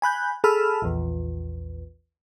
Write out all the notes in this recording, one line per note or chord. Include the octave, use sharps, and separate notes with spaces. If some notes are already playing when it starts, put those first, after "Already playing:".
G#5 B5 F#6 G6
G#4 A4 A5 B5 E6 F6
A#1 E2